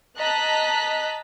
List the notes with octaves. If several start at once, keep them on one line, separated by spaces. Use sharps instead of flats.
D#5 A5 A#5 F#6 B6